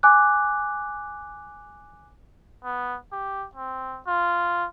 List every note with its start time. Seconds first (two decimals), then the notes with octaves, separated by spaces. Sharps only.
0.03 G#5 D6 F#6
2.64 B3
3.12 G4
3.55 C4
4.07 F4